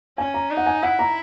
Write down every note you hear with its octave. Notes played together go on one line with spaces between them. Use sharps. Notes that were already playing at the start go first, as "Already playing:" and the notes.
C#4 G#5
A#5
D#4
F#5
G#5
E4 F#5
A#5